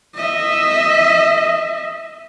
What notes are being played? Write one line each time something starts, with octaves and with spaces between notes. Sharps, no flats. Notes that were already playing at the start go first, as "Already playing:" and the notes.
D#5 E5